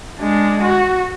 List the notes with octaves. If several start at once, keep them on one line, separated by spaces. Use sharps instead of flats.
G#3 D4
F#4